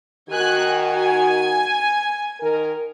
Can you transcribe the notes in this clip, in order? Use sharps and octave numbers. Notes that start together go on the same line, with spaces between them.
D#3 F#4 G#5 F#6
G#5
D#3 A#4